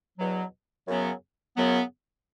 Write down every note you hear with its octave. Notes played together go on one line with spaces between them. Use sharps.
E2 B2 F#3
F#2 C#3 F#3 B3
F#2 C#3 F#3 B3